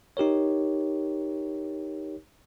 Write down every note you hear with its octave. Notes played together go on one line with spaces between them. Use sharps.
D#4 G4 A#4 C#5